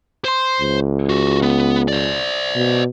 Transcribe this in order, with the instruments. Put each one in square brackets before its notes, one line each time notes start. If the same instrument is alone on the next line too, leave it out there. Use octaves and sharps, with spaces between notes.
[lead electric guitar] C5 C6
[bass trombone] C#2
[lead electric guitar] F#4 G4
B3
C5 D5
[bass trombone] B2